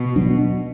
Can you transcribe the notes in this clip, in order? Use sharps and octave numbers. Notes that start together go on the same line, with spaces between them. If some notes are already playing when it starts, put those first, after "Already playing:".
Already playing: B2
F#3 D4